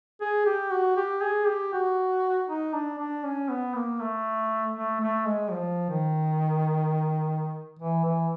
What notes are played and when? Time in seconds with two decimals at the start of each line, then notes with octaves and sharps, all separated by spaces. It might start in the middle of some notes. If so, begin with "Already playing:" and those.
0.21 G#4
0.46 G4
0.71 F#4
0.97 G4
1.22 G#4
1.47 G4
1.73 F#4
2.49 D#4
2.73 D4
2.99 D4
3.24 C#4
3.50 B3
3.75 A#3
4.00 A3
4.76 A3
5.01 A3
5.27 G#3
5.51 F3
5.90 D#3
7.79 E3
8.05 E3